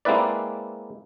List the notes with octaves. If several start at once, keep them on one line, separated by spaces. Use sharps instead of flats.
G#3 A#3 C4 E4 B4 D5